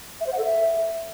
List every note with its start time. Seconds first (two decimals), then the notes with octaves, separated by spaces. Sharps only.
0.21 E5
0.26 C5
0.32 F#5
0.38 A4
0.44 E5